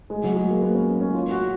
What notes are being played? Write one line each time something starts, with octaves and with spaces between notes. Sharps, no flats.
G#3
F#3
G#3
A#3
B3
C#4
C#4
F4
F#4